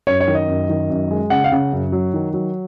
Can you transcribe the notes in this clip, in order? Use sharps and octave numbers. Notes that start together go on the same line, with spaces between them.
F#2 C#5
C#5
D#3
D#5
F#2
D#3
F#2
G#3
C#3 F#5
F5
C#3 F#5
F#2
F#3
D#3
F#3